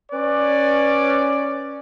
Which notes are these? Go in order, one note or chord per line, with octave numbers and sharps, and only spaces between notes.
C#4 B4 D5